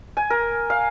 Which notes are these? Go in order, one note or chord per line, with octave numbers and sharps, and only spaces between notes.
G#5
A#4
F5